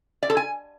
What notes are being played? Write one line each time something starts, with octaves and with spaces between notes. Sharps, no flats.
D5
A4
G#5